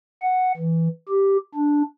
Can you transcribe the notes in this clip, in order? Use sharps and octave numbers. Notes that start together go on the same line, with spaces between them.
F#5
E3
G4
D4